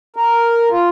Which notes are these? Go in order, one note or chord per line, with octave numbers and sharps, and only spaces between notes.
A#4
F4